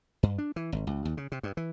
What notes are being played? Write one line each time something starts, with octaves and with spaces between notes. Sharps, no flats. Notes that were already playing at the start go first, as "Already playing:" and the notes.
G2
D4
E3
G#1
C#2
D#2
C#3
C3
G2
E3